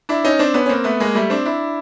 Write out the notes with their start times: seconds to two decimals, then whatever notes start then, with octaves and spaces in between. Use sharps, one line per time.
0.09 D4 E4
0.24 C#4 D#4
0.39 C4 D4
0.54 B3 C#4
0.66 C#4
0.69 A#3 C4
0.84 A3 B3
1.00 G#3 A#3
1.15 G3 A3
1.30 C4 D4
1.45 D4 E4